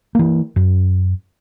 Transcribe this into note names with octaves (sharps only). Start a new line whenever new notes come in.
E3 A#3
F#2